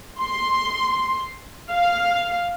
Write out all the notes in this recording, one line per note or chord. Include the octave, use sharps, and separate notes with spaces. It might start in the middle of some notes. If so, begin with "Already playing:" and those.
C6
F5